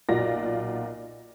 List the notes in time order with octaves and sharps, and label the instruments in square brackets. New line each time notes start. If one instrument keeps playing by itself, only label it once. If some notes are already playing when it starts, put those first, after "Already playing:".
[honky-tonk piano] B1 A#2 F4 F#4 D5 A#6